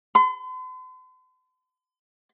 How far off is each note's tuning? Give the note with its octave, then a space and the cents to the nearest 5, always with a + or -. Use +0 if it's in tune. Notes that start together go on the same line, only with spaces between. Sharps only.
C6 -45